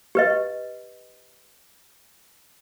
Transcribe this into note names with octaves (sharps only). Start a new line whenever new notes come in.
G4 B4 D#5